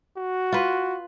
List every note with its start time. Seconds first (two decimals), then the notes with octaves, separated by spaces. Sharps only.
0.17 F#4
0.52 F4 B4